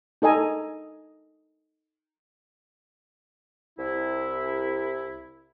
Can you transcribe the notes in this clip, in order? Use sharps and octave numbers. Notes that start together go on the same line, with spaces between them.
D#4 A4 D#5 G#5 A#5
C2 E4